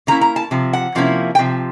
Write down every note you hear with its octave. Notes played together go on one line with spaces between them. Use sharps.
C3 F3 A#3 C#4 E4 A#5
A#5
A5
C3 F3
F#5
C3 F3 A#3 C#4 E4
G5
C3 F3